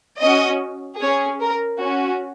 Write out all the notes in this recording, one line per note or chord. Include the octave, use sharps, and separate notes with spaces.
C#4 F#4 D#5
C#4 G#4 C#5
A#4
C#4 F#4